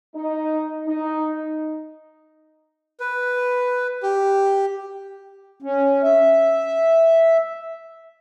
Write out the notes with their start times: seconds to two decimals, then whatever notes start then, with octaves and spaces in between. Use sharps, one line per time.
0.15 D#4
0.87 D#4
3.00 B4
4.03 G4
5.62 C#4
6.03 E5